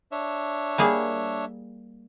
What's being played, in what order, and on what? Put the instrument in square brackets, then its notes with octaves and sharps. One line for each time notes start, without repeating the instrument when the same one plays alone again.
[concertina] D4 C#5 E5
[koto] G3 A#3 G#4